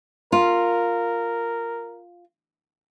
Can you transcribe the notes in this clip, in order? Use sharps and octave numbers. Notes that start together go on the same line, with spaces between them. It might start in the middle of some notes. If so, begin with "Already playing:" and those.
F4 A#4